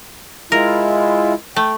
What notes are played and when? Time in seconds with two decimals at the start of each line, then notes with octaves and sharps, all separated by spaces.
0.52 G#3 E4 F4 A#4
1.56 A3 G5